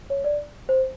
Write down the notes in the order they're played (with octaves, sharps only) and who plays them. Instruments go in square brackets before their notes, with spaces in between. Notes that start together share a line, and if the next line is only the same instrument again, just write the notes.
[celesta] C#5
D5
C5